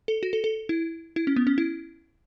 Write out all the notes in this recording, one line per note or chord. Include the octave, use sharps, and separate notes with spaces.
A4
F#4
A4
A4
E4
E4
C#4
B3
C#4
E4